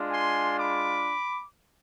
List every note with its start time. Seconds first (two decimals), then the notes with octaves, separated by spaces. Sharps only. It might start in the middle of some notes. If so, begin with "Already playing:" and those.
Already playing: G#3 D4 F4
0.11 G#5 C6
0.59 B5 D6